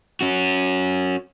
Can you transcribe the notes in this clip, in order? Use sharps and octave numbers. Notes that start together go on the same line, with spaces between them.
C#4 F#4